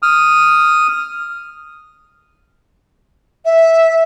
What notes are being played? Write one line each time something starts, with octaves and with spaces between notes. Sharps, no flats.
D#6 F6
E5